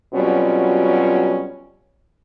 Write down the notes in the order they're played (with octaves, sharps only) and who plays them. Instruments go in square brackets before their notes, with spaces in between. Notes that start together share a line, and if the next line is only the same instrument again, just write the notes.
[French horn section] B2 F#3 G3 C4 C#4 F4